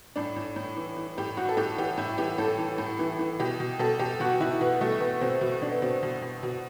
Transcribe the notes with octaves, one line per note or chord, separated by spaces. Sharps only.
A2 D4
A2
A2
E3
E3
A2 G4
A2 F#4
A4
A2 G4
E3 G4
A2 E4
E3 G4
A2 A4
E3
A2
E3
E3
B2 G4
B2
B2 A4
B2 G4
B2 F#4
B2 E4
B2 B3
B2 A3
B2 B3
B2 C4
B2
B2 D4
B3
B2 C4
B2
B2
B2